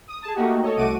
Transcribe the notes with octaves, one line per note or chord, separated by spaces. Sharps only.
D#6
G#4 A5
A3 A#3 D#4 F#4 G4
A4 C#5 D#5
C2 A3 F#4 D6 D#7